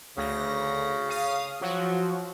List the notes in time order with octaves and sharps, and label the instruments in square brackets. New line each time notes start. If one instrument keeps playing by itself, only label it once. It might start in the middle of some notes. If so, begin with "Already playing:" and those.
[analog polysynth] D2 A#6 [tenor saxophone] C#3
[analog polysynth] F5 D#6
[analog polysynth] F3 F#4 [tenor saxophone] F#3